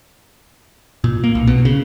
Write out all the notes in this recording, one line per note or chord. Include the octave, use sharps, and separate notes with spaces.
A#2
A#3
B1
B2
C#3